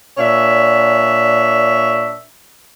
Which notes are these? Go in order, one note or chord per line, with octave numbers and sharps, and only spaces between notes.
A#2 D4 C#5 E5